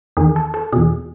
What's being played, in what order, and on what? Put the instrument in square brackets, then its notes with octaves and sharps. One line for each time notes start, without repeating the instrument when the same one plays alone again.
[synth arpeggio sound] E2 D#3 G#4
A4
A4
E2 B2 G#4